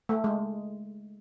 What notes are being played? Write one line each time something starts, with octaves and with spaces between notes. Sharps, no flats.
A3
G#3